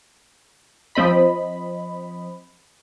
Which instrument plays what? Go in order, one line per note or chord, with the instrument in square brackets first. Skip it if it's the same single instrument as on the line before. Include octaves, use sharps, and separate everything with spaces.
[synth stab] F3 C4 D#5 B5